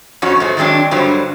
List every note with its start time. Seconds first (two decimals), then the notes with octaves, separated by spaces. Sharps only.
0.22 F2 F3 C#4 F#4
0.40 G#2 A3 F#4 C5
0.57 D#3 F#3 G#3 C4 D4
0.91 G2 D3 F#3 G3 C5